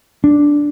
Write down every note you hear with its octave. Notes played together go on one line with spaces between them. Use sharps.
D4